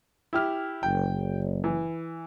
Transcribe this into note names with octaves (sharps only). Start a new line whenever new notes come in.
E4 G4 F6
F#1 G5
E3